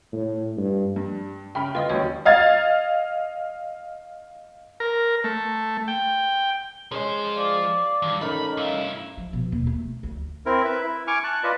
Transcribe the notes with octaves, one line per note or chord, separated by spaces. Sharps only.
A2
G2
G2
C#3 E5 G5 B5 F6
D2 F4 B4 D#5 D#6
G#1 D#2 F#3 C#4 C#5 F5
D#5 F5 G#6 A6
A#4
A3
G5
F3 G#3 C#4 G#4 C5
D5 F5 D6
G2 D#3 E3
D#3 A3 C#4 D#4 B5
G2 E4 F5
F3
B2
D#1
A3
D2
C4 E4 A#4
B4 E5
E4
G#5 C#6 D6 F6
A5 C#6 F#6
F4 B4 D5 D#5